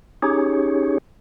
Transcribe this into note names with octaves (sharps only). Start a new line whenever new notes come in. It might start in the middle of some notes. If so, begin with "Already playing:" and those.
C#4 D#4 G4 G#4 C#5